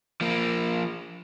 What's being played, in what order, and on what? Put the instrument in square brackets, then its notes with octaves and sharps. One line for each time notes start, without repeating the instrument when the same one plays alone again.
[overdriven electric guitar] F3 A#3